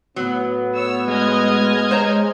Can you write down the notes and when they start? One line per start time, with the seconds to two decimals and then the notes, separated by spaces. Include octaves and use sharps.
0.16 A2 F#3 B3
0.73 C#5 E6
1.08 G#3 D#5 F6 G#6
1.91 C5 C#5 A#5